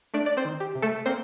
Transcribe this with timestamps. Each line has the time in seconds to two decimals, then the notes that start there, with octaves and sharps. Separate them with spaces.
0.14 A3 D4 D5
0.26 D5
0.37 C4 C5
0.45 D#3
0.60 G4
0.75 C3
0.82 A3 A4
1.06 A#3 C4 C5